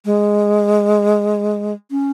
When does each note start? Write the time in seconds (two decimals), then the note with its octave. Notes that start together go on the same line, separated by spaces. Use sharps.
0.05 G#3
1.91 C#4